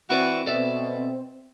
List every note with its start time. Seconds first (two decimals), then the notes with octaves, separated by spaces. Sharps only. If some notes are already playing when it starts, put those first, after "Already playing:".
0.10 E3 C4 E4 F#4 B4 D5
0.46 B2 A4 D5 E5